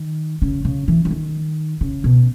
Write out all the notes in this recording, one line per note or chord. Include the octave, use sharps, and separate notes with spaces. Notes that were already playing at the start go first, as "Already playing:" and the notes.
Already playing: D#3
C#3
C#3
E3
E3
D#3
C#3
B2